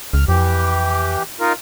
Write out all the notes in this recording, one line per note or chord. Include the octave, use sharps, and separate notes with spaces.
C#2 F6
F2 E3 G4
D#4 F4 A#4